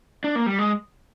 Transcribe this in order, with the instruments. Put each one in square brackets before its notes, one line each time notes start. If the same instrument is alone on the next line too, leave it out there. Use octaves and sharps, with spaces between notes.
[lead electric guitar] D4
A#3
G3
G#3